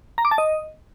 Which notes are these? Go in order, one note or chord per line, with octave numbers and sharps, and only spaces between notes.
A#5
D6
A5
D#5